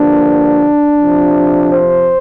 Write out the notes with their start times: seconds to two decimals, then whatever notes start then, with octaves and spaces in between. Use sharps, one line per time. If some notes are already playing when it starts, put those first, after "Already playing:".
Already playing: G2 D3 F3 A#3 D4
0.99 F2 C3 F3
1.71 C5